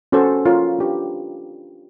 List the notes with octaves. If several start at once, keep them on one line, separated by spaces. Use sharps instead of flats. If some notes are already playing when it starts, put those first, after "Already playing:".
C#4 F#4 A4 C5
F4 A#4 C#5
D4 G4 B4